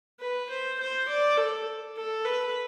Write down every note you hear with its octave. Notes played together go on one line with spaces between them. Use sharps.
B4
C5
C5
D5
A4
A4
B4